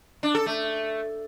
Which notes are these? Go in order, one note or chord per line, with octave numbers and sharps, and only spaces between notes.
D4
A4
A3